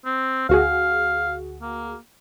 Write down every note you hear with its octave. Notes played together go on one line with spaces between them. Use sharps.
C4
D2 F#4 G#4 F5
A#3